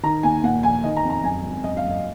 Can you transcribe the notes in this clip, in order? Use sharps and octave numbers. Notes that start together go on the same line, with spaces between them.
D#3 A#5
D#2 G#5
A#2 F#5
A#1 G#5
D#3 D#5
A#5
F2
A#5
F#2 G#5
G#1
F#2 D#5
F5
F#1
D#5